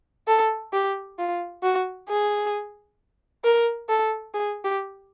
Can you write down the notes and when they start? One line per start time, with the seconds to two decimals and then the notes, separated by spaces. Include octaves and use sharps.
0.28 A4
0.73 G4
1.19 F4
1.63 F#4
2.09 G#4
3.44 A#4
3.89 A4
4.34 G#4
4.64 G4